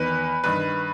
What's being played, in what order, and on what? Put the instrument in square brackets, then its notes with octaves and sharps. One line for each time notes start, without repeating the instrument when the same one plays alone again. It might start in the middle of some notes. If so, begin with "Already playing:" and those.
Already playing: [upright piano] E2 D#3 B4
G2 D#3 B4